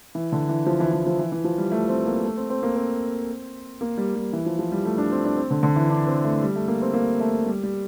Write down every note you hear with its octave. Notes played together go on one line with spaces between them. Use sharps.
E3
D3
E3
F3
E3
E3
F3
E3
E3
F3
G3
A3
C4
A#3
A3
C4
C4
A#3
C4
A#3
G3
G3
E3
F3
F3
G3
A3
D4
C4
D4
C4
D3
D3
E3
D4
C4
A3
G3
A3
A#3
C4
A#3
A3
G3
G3